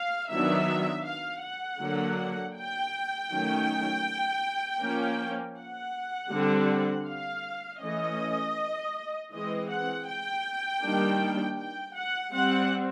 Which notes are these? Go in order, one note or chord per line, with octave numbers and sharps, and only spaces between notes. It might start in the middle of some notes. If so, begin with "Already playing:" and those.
Already playing: F5
D#3 F#3 B3 D4 E5
F5
F#5
D3 F#3 A#3 D4
G5
D#3 F#3 A3 C#4
F3 A#3 C#4
F#5
D3 G3 C4
F5
E3 A3 C#4 D#5
E3 G#3 C4 D#5
F#5
G5
D#3 G3 A#3 D4
G5
F#5
G3 C4 F#5